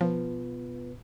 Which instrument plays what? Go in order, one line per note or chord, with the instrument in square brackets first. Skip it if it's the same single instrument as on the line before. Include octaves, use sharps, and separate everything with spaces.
[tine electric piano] B2 B3 F4 B4 [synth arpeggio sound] F3